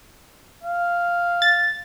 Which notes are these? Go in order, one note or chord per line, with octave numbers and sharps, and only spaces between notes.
F5
A6